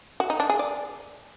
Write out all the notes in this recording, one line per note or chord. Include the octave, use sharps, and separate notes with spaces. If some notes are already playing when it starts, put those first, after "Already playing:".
F#4
D#4
D4
G#4
D5